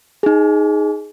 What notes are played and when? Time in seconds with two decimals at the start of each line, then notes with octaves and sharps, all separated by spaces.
0.23 D#4 G#4